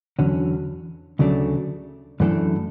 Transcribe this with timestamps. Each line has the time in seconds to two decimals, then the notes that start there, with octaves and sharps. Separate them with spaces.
0.19 E2 D3 F#3 C#4
1.19 D2 C#3 F#3 A3 D4
2.20 F#2 E3 A3 D4 A4